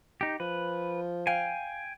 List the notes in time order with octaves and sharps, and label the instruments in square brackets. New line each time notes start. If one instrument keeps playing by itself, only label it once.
[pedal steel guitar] D#4 G4
[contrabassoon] F3 [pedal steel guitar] B4
[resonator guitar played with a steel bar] F5 [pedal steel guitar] G5 G#5